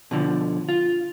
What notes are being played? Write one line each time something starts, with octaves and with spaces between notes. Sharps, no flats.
B2 D3 F3
F4